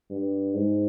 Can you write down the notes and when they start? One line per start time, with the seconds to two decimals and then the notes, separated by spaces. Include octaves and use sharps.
0.10 G2
0.54 G#2